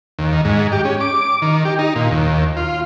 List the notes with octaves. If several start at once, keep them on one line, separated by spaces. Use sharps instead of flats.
D#2
D#3
G#2
G4
C#4
D6
D#3
G4
D#4
A#2
D#2
F4